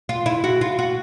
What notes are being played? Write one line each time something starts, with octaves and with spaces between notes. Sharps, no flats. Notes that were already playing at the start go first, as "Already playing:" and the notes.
F4
E4
F#4
F4
F#4